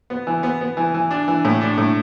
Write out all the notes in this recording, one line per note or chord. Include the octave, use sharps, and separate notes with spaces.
B3
E3
B3
B3
E3
E3
D4
E3
A2
D4
A2